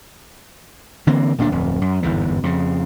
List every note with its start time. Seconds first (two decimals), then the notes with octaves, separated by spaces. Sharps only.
1.07 D3 E3 A#3 C4
1.38 D1 A#2 C#4 D4
1.52 D1 F2
1.82 F#2
2.03 G1 E2 G#2 E3
2.43 F2 C#3